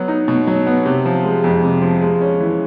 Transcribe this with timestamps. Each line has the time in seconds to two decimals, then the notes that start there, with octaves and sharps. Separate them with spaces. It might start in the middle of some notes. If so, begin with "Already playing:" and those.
Already playing: F#3 B3
0.08 D#4
0.28 B2
0.47 F#3
0.66 B3
0.85 C3
1.05 F3
1.24 G#3
1.44 F2
1.63 C3
1.82 F3
2.01 G#3
2.21 C#4
2.40 E3